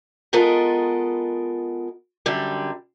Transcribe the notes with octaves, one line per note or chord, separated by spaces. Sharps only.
G#3 B3 F4 A4 A#4 D#5
F#2 D3 G3